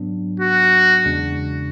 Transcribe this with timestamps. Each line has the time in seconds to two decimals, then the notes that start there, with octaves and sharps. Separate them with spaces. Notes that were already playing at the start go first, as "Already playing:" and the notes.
Already playing: G#2 F#3 B3 D4
0.40 F#4
1.05 E2 C#3 G#3 D4